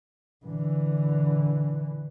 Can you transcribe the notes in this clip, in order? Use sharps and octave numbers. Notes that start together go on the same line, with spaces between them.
D3 E3